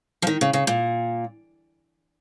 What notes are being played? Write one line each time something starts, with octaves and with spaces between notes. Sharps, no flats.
F3
D#3
C#3
C#3
A#2